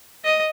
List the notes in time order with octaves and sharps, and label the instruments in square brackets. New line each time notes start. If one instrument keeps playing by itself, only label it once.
[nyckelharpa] D#5